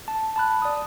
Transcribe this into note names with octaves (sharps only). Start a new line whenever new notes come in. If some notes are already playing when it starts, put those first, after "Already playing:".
A5
A5 B5 F#6
D5 D#6